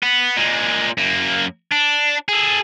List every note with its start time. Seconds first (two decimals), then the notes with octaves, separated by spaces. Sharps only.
0.03 B3
0.37 A#2 G#3
0.98 F#2 A#3
1.72 D4
2.29 G#4 A4